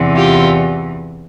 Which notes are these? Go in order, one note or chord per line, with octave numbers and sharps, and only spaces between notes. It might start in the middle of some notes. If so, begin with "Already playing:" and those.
Already playing: E2 C3 E3
F4 G4